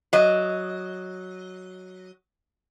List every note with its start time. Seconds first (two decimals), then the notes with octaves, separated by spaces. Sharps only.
0.13 F#3 D#5